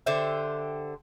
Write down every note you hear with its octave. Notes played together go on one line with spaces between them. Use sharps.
D3 G4 C5 E5